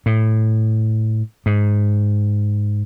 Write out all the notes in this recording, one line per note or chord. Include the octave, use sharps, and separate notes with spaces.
A2
G#2